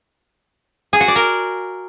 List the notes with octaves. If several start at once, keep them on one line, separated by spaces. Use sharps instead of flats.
G#4
F#4
D5
A#4